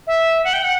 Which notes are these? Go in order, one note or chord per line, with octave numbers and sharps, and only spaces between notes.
E5
F#5
G5
F#5